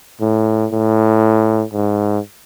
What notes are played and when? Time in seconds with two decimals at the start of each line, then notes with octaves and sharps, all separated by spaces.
0.21 A2
0.72 A2
1.73 G#2